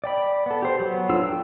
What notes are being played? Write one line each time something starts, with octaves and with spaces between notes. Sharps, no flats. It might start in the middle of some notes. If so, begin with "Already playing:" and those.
D5 G5 B5
B3 A4
G4 C5
F#3 B3
F#3 D4 F4 A4 E6
G5